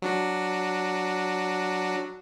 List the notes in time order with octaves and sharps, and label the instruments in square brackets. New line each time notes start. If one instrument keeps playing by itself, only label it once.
[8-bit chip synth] F#3 D4 F#4